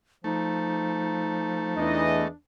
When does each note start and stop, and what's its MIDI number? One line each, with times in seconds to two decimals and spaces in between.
0.24 1.74 53
0.24 2.28 57
0.24 2.03 63
1.77 2.27 40
1.77 2.27 52
1.77 2.34 62
1.77 2.27 75